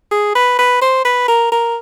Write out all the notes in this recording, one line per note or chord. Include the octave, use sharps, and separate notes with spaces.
G#4
B4
B4
C5
B4
A#4
A#4